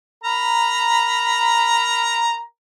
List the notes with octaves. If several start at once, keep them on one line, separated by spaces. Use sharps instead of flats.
A#4 A#5 B5